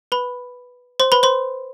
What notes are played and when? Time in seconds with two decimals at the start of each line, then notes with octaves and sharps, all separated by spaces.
0.12 B4 B5
1.00 C5 C6
1.12 B4 B5
1.23 C5 C6